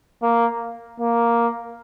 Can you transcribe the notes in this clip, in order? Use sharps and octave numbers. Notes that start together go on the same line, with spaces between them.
A#3
A#3